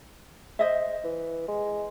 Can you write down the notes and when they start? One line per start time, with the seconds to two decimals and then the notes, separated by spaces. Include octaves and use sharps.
0.59 C5 D#5 E5
1.04 E3
1.48 G#3